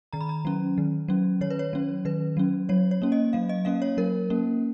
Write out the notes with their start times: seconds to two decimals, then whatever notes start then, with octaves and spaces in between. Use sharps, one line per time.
0.13 D#3 A#5
0.21 B5
0.29 A#5
0.45 F#3 C#4
0.78 D#3
1.08 F#3 C#4
1.41 D#3 C#5
1.50 B4
1.59 C#5
1.73 F#3 C#4
2.05 D#3 B4
2.37 F#3 C#4
2.69 F#3 C#5
2.91 C#5
3.02 A#3 C#4
3.12 D#5
3.33 F#3 F5
3.49 D#5
3.65 A#3 C#4 F5
3.82 C#5
3.97 F#3 A#4
4.30 A#3 C#4